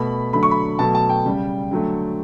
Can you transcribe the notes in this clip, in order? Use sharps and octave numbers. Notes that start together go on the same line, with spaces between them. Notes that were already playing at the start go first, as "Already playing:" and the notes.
Already playing: B2 A3 B5
D3 F#3 A3 B5
C#6
B5
B2 F#3 A3 A5
A5
G5
C#3 G3
D3 F#3 A3